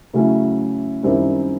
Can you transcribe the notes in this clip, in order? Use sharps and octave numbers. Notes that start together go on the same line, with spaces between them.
C#3 F#3 A3 C#4 E4
F#2 D#3 G3 C4 E4